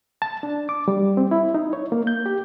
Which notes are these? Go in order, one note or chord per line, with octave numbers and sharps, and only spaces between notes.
A5
D4
D6
G3
C4
E4
D#4
C#5
A#3
G6
G4